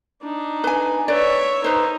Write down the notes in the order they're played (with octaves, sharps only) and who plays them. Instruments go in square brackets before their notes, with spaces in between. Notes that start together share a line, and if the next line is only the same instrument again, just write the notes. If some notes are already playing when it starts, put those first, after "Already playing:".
[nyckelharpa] D4 D#4
[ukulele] B4 G#5
[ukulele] B4 D5 [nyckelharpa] C#5 E5
[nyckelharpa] D#4 [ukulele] B4 C5